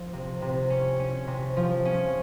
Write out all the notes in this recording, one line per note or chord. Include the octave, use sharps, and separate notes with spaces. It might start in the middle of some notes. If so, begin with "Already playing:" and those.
Already playing: F3
C3
C3
C#4
C#4
C3
F3
C#4